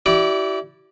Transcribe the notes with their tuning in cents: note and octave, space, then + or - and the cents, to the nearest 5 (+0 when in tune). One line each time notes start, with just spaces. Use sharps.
E4 +0 G4 -40 D5 +0